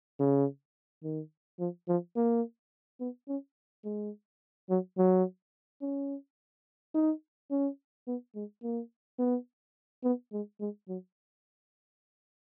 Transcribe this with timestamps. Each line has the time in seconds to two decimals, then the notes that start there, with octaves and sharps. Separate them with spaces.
0.19 C#3
1.03 D#3
1.59 F3
1.88 F3
2.16 A#3
3.00 B3
3.28 C#4
3.85 G#3
4.70 F#3
4.98 F#3
5.81 C#4
6.94 D#4
7.51 C#4
8.07 B3
8.35 G#3
8.63 A#3
9.19 B3
10.04 B3
10.32 G#3
10.60 G#3
10.88 F#3